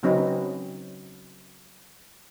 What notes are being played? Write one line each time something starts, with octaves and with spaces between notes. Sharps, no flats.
C#3 F#3 C4 C#4 D#4 B4